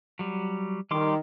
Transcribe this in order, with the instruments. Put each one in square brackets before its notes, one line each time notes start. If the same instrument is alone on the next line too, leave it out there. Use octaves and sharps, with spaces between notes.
[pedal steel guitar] F#3 G3
[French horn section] D#3 [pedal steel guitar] G3 C6 D6